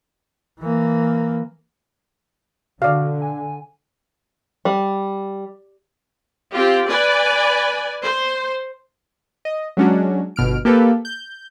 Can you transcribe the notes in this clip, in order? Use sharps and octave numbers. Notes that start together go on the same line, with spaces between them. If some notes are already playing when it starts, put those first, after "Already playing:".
E3 A#3
D3 F#4 D5 F5
G#5
G3
C4 F4 G4
B4 D5 G#5
C5
D#5
F#3 G#3 C#4 D4 F#4
G1 B2 F6 D7
A#3 G4 A4 B4
G6